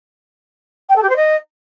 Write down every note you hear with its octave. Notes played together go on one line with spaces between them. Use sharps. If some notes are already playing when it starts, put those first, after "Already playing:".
G5
A4
G4
C5
D#5